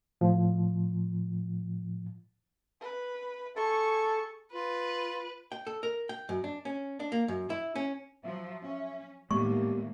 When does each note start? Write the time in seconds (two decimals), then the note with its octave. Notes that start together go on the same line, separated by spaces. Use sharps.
0.21 A2 F3
2.81 B4
3.57 G#4 A4 C#6
4.53 F4 B4
5.52 G5
5.67 A4
5.83 A#4
6.09 G5
6.29 F#2
6.44 D4
6.65 C#4
7.00 D4
7.12 A#3
7.28 F#2
7.50 E4
7.76 C#4
8.24 F3 F#3 E5
8.63 C#4
9.31 D#2 A2 G#3 A#3 B3 G4 C#6